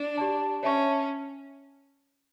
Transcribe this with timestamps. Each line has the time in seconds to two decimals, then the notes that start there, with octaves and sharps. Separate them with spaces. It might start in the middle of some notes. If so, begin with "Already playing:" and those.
Already playing: D4
0.18 G4 D5 A5
0.63 C#4 C#5 E5 A5 C#6